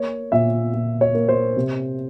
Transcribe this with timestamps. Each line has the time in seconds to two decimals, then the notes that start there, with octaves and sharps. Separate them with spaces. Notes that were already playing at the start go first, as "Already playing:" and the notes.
Already playing: A#3 C#5
0.32 A#2 E5
0.74 A#2
1.01 C#5
1.15 A#3
1.29 C5
1.56 C3